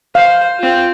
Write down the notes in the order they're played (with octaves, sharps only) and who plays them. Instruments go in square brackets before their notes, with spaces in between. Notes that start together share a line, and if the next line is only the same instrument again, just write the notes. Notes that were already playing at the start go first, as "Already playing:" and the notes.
[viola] C5 [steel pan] F5
[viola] C4 F4